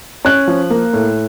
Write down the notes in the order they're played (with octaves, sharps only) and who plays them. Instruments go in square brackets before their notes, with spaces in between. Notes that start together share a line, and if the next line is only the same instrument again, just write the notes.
[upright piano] C#4 F#6
F3
A#3
A2